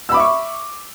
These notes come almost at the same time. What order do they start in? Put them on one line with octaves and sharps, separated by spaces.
E6 B5 D6 E5 C#6